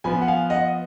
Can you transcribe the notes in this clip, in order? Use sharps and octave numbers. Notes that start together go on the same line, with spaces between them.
F3 B3 G#5 B5
F#5
F5 G#5
D#5 F#5